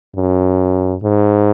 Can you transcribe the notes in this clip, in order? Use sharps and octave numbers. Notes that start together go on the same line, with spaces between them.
F#2
G#2